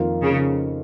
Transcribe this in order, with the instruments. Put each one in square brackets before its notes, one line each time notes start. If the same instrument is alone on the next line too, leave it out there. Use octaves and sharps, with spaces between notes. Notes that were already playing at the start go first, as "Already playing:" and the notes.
Already playing: [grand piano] F2 D#3 A#3 F4
[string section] C#3